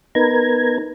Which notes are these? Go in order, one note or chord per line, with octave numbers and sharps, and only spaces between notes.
B3 D#4 A#4 B4 A#5 G#6